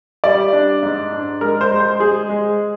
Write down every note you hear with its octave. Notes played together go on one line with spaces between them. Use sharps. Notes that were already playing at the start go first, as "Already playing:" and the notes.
G3 D5
D4
G#2
D4
G#3 A#4
C5
G#3
C5
G#3 G#4
G#3